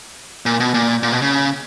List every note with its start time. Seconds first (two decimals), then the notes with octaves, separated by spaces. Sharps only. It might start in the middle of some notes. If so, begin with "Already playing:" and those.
0.46 A#2
0.60 B2
0.74 A#2
1.03 A#2
1.12 B2
1.22 C#3